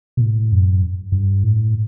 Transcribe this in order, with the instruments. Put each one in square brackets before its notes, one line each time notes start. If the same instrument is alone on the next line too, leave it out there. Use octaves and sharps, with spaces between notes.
[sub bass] B2
A2
F#2
G2
A2